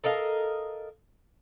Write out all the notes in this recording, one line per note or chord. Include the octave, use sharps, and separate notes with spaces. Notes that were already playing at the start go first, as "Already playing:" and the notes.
A4 A#4 D#5 F5